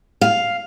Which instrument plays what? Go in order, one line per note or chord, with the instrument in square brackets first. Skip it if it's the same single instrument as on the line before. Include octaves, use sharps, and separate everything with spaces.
[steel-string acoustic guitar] F5